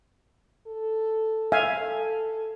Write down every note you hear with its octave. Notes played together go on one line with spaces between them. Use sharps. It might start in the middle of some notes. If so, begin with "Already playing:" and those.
A4
E5 F5 G#5
A4